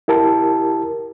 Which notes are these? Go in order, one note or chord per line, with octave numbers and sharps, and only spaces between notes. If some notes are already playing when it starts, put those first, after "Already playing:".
E4 G4 A#4 A5